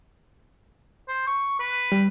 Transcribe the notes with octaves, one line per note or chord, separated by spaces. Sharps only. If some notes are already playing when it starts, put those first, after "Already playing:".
C5
C#6
B4
G3